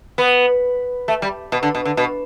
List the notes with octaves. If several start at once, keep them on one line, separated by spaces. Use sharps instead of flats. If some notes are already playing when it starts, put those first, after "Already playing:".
B3
A3
G3
B2
D3
B2
D3
B2